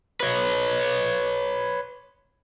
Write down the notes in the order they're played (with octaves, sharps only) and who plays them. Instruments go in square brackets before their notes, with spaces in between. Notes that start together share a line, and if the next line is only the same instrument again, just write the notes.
[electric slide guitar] B4 C#5